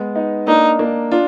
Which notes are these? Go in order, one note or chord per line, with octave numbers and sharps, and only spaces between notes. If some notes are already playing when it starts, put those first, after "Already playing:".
Already playing: G#3 B3
B3 D#4
A#3 D4 D#4
A#3 D4
D4 F4